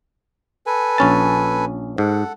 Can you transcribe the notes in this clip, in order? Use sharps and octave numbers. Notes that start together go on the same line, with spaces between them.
A4 B4 G#5
A#1 C#4 A5
G#2 A4 F#5